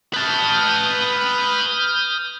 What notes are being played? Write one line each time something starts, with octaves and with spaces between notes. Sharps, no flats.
B4 A5 D#6 F6 G6